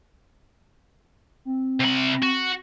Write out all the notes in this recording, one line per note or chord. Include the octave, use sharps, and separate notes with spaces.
C4
C3 B5
F#4